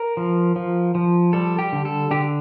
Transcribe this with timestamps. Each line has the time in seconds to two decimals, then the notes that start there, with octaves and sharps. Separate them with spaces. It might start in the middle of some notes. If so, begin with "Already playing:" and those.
Already playing: A#4
0.17 F3
0.56 F3
0.95 F3
1.33 G3 A4
1.59 G4
1.73 D3
1.85 A4
2.11 D3 G4